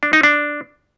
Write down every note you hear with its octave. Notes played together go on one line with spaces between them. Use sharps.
D4
D#4
D4